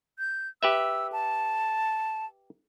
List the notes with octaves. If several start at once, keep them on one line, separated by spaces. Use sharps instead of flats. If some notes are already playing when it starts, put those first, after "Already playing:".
G6
G4 B4 E5 E6
A5